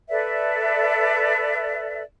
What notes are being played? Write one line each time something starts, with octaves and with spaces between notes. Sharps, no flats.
A4 B4 D5 E5